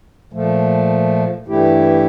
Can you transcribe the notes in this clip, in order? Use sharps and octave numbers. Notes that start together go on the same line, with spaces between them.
A#2 F3 A3
G2 E3 A3 E4 G4